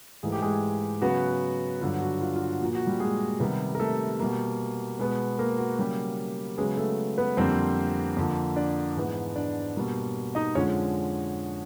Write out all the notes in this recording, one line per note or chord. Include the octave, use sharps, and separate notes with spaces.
G#2 E3 A3 G#4
G4
G#3 G#4
C#3 F#3 B3 F#4
G2 D3 F#3 F4
F#4
F4
F4
F#4
A#2 F3 A#3 F#4
F#4
G3 G4
G#3 G#4
C3 D#3 G3 B3
A#4
A3 A4
B2 G3 A#3
B2 G#3 B3
A#3 A#4
F#4
C#3 F#3 G3 A#3 G4
C#3 F#3 G#3 B3 G#4
A3 A4
B3 B4
F2 D3 G3 A#3 C4 C5
F2 D3 F3 A#3
D4 D5
G#2 E3 G#3 B3
D4 D5
B2 G3 A#3
D#4 D#5
F2 D3 F3 G#3 C#4 C#5